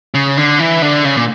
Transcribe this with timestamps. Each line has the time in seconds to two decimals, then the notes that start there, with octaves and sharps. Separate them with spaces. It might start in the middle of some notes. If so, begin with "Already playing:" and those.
0.14 C#3
0.37 D3
0.59 E3
0.82 D3
1.05 C#3
1.17 A#2